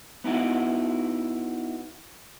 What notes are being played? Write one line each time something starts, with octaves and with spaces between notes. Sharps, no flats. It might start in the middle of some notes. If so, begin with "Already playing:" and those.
B3 D#4 E4 F#4